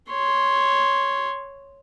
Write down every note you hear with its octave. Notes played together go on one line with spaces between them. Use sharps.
C#5 C6